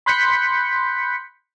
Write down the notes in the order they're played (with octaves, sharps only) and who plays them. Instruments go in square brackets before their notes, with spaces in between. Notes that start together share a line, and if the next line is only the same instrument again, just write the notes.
[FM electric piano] B5 C6 F#6 G6 B6 C#7